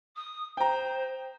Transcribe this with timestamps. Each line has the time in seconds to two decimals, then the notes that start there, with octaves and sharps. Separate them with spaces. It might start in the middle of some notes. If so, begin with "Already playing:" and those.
0.16 D#6
0.57 C5 G5 A#5